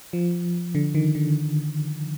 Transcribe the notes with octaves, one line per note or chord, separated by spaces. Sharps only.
F3
D3
D#3
D3